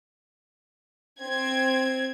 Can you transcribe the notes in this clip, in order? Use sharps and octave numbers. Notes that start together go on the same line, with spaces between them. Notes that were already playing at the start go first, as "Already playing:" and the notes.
C4 G#6